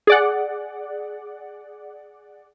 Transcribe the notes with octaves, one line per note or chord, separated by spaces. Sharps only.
G#4 D5 F#5